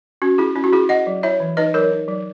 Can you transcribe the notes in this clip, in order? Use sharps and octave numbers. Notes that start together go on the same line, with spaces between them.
C#4 F#4
E4 G#4
C#4 E4
F#4
E4 G#4
E4 D#5 F#5
F#3
E4 C#5 E5
E3
D#4 B4 D#5
F#3 A#4 C#5
D#4
F#3